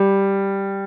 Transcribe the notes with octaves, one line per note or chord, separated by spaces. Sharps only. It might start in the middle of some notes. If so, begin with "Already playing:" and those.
Already playing: G3